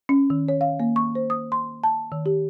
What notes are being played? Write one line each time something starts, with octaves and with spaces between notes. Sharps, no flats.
C#4
D#3
C#5
F5
A#3
C#6
C5
D#6
C6
A5
D#3
G4